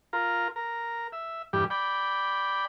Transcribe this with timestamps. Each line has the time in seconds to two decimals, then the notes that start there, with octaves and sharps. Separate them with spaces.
0.13 F4 A#4
0.56 A#4
1.12 E5
1.53 E2 G2 G3 G4
1.70 D5 G5 B5